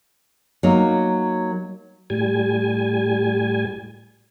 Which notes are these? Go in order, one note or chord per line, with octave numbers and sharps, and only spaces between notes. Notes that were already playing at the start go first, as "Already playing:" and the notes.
F#3 A#3 D#4
A2 G3 G#5